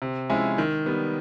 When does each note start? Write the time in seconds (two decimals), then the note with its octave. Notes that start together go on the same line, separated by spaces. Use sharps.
0.02 C3
0.30 F3 G#3 C#4 E4
0.58 D#3
0.86 G3 B3